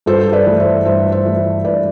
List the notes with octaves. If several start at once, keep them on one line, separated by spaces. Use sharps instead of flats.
G2 A4 C5
B4 D5
E3 A3
C5 E5
G2 C5 E5
C5 E5
E3 A3
G2 B4 D5